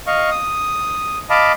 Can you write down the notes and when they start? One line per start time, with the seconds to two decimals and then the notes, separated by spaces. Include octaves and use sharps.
0.07 D#5 F5 C#6
0.31 D#6
1.30 D#5 F5 A5 B5 D6